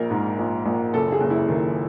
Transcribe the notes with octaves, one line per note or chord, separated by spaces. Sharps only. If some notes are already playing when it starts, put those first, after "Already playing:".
Already playing: A#1 A#4
G#2
A#1
A#1
F#1 A4
G#4
F#1
E4
D#3